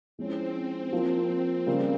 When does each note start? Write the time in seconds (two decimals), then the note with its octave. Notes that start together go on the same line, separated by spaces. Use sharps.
0.18 F3 G#3 C4 C#4 E4
0.93 F3 A#3 F4
1.66 C#3 G3 A#3